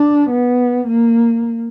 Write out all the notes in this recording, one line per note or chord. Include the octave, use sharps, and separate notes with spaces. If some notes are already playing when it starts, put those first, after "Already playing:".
Already playing: D4
B3
A#3